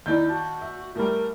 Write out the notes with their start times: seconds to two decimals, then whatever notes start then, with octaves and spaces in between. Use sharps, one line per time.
0.06 D#2 D#4 E4 D5 G6
0.29 F#4 A5
0.61 E5
0.95 A2 G3 A#4